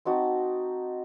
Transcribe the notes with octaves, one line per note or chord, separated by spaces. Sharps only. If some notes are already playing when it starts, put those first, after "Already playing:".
C4 D#4 F#4 A5